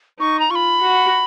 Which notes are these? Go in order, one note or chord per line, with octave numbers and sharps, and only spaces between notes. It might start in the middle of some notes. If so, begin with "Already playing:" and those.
D#4 C#6
A#5
F4 B5 C#6
F#4